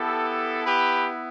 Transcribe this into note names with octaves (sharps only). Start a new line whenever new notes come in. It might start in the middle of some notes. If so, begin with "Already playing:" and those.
Already playing: B3 E4 G4 A4
G4 B4